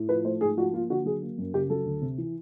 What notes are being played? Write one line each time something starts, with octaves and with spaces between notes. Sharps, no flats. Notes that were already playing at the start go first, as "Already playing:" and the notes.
Already playing: A2
F3 B4
A3 C5
G#2 G#4
F3 F#4
A#3 F4
D3 F#4
F#3 G#4
A#3
F#2
C#3 G4
F#3 A4
D2
C3
E3